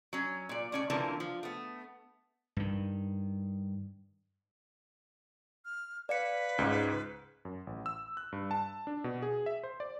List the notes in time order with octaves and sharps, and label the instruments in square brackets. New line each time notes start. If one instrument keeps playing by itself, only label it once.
[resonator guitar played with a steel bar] F#3 C#4
A#2 D5
A2 C#4 D5
D3 E3 F3 A#3 C4 C#4
F3
A3 B3
[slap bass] G2 D#3
[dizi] F6
[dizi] B4 [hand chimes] D5 F5 C#7
[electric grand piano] C#2 G#2
F#2
A1
E6
F#6
G2
A5
D4
B2
G#4
E5
C5
D5